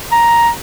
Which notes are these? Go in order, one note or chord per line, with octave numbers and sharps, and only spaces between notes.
A#5